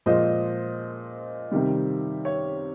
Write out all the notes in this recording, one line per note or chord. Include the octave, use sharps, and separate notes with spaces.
A#2 F3 G#3 C5 D#5
C3 D#3 G3
C#5